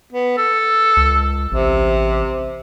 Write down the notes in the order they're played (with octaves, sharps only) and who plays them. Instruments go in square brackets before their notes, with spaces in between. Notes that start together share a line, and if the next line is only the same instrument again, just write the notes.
[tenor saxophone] B3
A4
[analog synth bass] C#2
[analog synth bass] A1 [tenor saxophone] C3